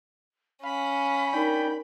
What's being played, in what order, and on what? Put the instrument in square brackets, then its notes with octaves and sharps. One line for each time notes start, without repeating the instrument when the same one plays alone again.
[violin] C#4 [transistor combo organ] F5 [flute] B5
[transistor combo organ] D4 G5 [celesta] D#4 A#4